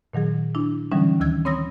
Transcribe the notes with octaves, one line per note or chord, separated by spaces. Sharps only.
A#2 D#3 F#3 G#4
D4 E4
D3 E3 F#3 G3 C#4 D#4
D2 D#3 E6 G#6
C4 C#5 B5 D#6 E6 A#6